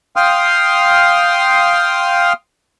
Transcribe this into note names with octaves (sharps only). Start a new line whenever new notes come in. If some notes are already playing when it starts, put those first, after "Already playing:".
F5 G5 C6 D#6 F6